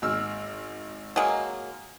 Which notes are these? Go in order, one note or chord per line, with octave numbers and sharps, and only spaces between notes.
G#1 E6 F6
F#3 G#3 A#3